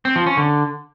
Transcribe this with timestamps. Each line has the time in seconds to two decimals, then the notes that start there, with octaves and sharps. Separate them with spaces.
0.05 C4
0.16 F3
0.26 C#4
0.37 D3